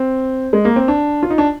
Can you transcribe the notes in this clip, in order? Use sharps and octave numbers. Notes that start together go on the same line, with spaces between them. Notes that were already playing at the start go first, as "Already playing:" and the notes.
Already playing: C4
G#3
A#3
C4
D4
F4
D#4
D4